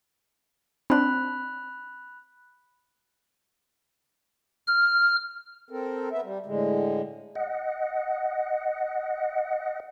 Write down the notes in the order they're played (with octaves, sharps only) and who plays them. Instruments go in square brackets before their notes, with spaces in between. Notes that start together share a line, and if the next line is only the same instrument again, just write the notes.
[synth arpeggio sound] C4 D4 [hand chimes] B5 F#6
[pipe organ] F6
[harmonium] C4 A4 A#4
B3 E5
G3
A2 D3 G#3
[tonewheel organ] D#5 F#5